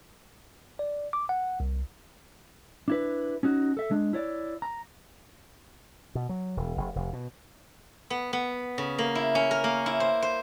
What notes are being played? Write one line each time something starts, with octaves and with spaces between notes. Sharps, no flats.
D5
D6
F#5
C2
D4 E4 B4
C#4 D#4 F#4
A4 E5
G#3 D4
E4 C#5 D5
A#5
B2
F#3
E1
F1
F1
B2
B3
B3
C#3
A#3
E4
C#4
A#4
A#3
E4
C5
C5